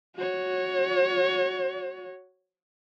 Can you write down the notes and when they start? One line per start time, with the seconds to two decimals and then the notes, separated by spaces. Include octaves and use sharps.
0.16 F#4 C#5